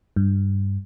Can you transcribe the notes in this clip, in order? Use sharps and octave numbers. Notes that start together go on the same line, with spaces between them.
G2